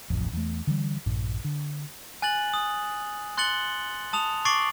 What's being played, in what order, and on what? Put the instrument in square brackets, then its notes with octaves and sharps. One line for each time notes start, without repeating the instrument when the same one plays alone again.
[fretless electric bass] D1 A1 F2
E2 A3
D3 E3 G3
A#1 G2 A#2
D3
[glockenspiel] G#5 F#6 A6 F#7
D#6
C6 F#6 A6 C#7 F#7 G7
A5 D#6 F7
C#6 D6 A6 C7 D7 F#7